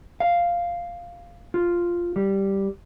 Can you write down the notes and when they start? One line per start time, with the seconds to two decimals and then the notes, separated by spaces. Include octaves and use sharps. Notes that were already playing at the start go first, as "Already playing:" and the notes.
0.20 F5
1.54 F4
2.16 G3